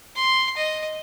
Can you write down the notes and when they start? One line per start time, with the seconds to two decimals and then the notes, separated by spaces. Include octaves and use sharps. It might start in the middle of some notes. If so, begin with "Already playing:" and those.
0.16 C6
0.57 D#5